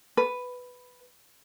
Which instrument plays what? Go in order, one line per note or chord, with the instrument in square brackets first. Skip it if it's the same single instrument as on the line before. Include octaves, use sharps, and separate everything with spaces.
[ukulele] B4